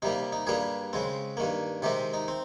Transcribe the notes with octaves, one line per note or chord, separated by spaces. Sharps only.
C3 G3 A#3 D#4
D#4
G2 G3 A#3 G#4
C#3 G#3 C4
G2 D#3 A#3
C3 D#3 G#3 C4 G4
D#4
C4